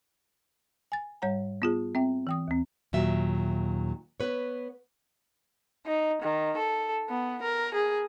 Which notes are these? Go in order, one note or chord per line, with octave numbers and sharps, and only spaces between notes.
G#5 A6
G#2 G3 C#5 F#5 A#5
B3 F4 G#4
C4 E5 G5
E3 G5 D#6
D#2 C4
D#2 A#2 F#3 E5
B3 B4 C#5
D#4
D#3
A4
B3
A#4
G#4